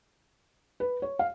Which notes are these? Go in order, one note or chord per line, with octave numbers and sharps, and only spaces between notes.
B4
C#5
F5